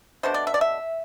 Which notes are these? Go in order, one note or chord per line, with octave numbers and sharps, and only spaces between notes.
B2 A3 D4 C5
D5
E5
D5
E5